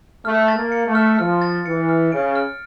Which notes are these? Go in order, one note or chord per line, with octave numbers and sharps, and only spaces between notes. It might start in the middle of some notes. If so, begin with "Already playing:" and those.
A3 F6
A6
A#3
C#7
A3
F6
F3 F6
A6
E3 C#7
F6
C#3 D7
F6